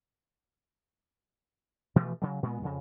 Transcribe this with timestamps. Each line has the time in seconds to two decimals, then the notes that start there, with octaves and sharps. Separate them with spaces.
1.96 B2 E3 F3 A3
2.22 C#3 F#3
2.43 A#2 G#3 B3
2.61 F2 C#3